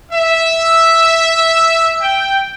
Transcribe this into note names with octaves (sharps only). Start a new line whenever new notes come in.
E5
G5